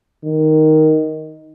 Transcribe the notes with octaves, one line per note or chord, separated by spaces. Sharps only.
D#3